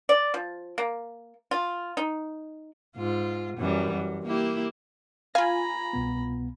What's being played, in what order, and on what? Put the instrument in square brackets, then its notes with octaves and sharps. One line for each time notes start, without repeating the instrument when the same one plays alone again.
[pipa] D5
F3
A#3
F4
D#4
[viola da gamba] G#2 F4
F#2 E3 G3
F#2
A#3 E4 G4
[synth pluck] F4 G#5 [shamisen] F5 [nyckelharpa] A#5 B5
[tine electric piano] C2 B2 B3